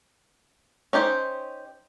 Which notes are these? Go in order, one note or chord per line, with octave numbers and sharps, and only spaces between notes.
C#4 D#4 G4 C5